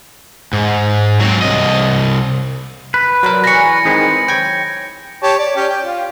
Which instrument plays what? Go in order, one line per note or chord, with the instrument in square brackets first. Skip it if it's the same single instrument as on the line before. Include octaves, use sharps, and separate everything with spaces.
[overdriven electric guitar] G#2
F#3 C4
C2 D#5
[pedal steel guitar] B4
[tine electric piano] F#3 A#4 [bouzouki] C5 D5
[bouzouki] E3 G#4 A#5 [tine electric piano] B5 C#6 [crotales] A#6 C#7
[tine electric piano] D#3 G#3 C4
C5
[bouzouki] F#3 [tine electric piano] G5 G#6
[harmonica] G4 C#5 A5
D5
C#4 G4
G5
F4